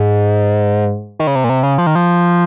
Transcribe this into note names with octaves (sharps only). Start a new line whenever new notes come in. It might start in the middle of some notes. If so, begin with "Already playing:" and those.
Already playing: G#2
D#3
C#3
C3
A#2
C3
C#3
F3
D#3
F3